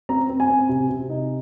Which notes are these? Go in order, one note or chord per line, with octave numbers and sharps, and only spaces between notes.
C4 A#5
C4
G#5
C4
C3
C3
D#4